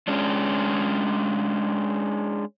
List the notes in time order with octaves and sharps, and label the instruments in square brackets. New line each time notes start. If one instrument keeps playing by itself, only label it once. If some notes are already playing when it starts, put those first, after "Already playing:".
[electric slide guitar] G#3 C#4 D4